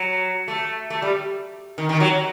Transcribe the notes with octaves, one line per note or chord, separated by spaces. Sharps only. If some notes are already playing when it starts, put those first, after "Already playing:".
Already playing: F#3
A3
A3
G3
D#3
D#3
F#3